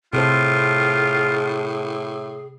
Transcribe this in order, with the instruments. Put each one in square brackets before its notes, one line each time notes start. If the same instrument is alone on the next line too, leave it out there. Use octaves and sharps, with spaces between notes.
[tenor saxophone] A2 [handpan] C3 A4 C5 [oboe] F4 [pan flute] G#4